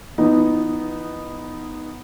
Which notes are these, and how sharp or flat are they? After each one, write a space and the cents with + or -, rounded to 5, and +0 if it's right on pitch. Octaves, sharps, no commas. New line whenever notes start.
E3 +35 B3 +0 D#4 +0